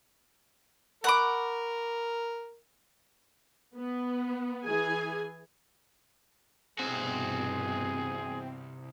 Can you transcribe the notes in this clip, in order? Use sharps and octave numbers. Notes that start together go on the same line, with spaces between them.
A#4 F#5 B5 C#6 D6
B3
E3 G#4 G#5
C2 G2 B2 E3 C4 F#4 G#4